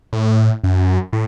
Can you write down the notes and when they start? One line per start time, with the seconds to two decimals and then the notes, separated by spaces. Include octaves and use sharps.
0.13 A2
0.64 F#2
1.13 A2